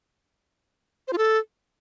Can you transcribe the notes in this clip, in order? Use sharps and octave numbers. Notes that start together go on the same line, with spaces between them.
C5
F4
A4